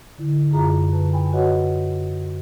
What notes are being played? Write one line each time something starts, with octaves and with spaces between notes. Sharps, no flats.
A2 D3 E4
F#2 F4 G#4 A#5
D3 B4 A5
G5 G#5 B5
F#4 B4 C#5 D#5 F#5